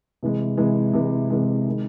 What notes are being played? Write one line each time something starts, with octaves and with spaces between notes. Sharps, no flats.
C3 E3 G#3
C3 E3 G#3
C3 E3 G#3
C3 E3 G#3
D#3 G#3